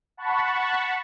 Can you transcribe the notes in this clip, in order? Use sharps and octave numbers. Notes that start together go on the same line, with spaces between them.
F#5 A5 B5 C#6